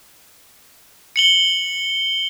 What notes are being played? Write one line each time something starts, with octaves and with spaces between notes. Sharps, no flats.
C#7 F#7 G7